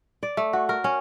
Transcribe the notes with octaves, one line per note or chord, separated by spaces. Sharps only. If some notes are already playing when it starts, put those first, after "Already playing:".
D5
A3
F#4
A#4
C#4